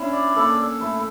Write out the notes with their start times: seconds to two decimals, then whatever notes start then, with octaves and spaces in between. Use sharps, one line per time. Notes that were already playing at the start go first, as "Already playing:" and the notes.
Already playing: C#4 D4 E4
0.12 D5
0.35 A#3 A4
0.58 A4
0.80 A3 E4